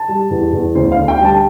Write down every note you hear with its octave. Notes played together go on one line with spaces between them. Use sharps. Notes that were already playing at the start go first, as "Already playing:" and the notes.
Already playing: A5
G3
E2
E2
D2 C5
F5
D3
G5
G3 A5